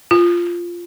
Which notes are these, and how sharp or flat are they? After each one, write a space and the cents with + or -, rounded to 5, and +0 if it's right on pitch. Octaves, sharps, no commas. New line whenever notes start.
F4 -5